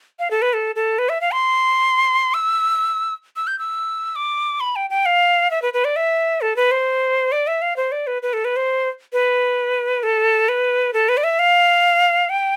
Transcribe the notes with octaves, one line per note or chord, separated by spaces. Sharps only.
F5
A4
B4
A4
A4
B4
E5
F5
C6
E6
E6
G6
E6
D6
B5
G5
G5
F5
E5
B4
B4
D5
E5
A4
B4
C5
D5
E5
F5
C5
D5
B4
B4
A4
B4
C5
B4
A4
B4
A4
B4
D5
E5
F5
G5